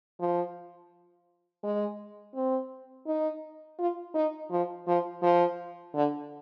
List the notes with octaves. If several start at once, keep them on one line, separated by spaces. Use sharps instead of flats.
F3
G#3
C4
D#4
F4
D#4
F3
F3
F3
D3